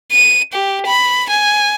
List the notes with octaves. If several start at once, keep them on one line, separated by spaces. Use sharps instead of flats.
D#7
G4
B5
G#5